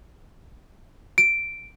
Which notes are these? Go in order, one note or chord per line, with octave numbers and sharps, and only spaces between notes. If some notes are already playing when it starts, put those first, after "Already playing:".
D7